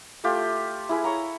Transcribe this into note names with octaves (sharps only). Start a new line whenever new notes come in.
A3 F4 G4
E4 G#4 B4
C#5 G5 A#5